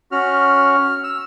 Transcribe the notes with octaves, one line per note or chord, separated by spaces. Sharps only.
C#4 F#4 F6
E6